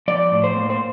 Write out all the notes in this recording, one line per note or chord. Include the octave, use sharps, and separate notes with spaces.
F3 D5
A2
C5
A#3
C5